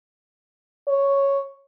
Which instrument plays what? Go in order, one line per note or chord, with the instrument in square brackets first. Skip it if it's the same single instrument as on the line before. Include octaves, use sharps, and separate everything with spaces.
[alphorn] C#5